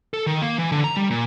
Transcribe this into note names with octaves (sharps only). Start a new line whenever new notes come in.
A4
D#3
A#3
E3
D3
A#5
G3
A#2